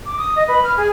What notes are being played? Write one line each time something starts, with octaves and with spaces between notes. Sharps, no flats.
D6
D#6
D#5
B4
F6
G#4